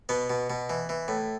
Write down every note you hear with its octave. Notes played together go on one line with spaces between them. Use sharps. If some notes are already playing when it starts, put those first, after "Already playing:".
B2 B3
B2
B2
E3
E3
A2